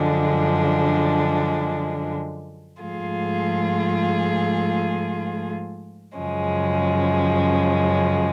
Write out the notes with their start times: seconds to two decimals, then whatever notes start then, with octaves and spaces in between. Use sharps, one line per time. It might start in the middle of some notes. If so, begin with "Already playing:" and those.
Already playing: F#2 D3 F3 G#3 D4
2.80 G#2 F3 A3 F4 G#4
6.17 F#2 C#3 F3 G#3 C#4